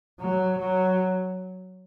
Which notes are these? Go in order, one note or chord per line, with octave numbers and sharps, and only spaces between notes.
F#3
F#3